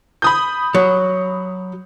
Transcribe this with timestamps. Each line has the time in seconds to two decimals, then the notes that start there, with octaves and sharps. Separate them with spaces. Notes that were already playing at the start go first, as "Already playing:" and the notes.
0.22 B5 D#6 G6
0.75 F#3